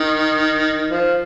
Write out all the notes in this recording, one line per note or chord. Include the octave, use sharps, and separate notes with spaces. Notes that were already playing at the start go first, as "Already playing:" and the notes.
Already playing: D#3
F3